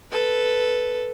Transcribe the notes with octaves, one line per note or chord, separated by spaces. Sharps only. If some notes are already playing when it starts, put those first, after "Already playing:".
A4 B4